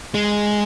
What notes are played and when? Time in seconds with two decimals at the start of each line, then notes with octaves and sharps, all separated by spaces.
0.14 G#3